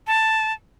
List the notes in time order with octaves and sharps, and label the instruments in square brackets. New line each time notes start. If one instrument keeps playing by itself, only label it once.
[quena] A5